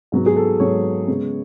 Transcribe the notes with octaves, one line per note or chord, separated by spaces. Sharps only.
G#2 F#3 B3
G#4
A4
G#2 F#3 B3 C#5
C#3 G#3 B3